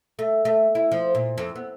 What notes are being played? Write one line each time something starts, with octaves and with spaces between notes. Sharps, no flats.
A3
A3
E4
F3
A#2
F2
B3